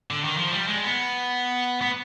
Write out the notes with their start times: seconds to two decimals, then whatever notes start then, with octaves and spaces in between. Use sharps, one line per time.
0.11 D3
0.24 D#3
0.37 F3
0.51 G3
0.68 G#3
0.84 B3
1.82 B3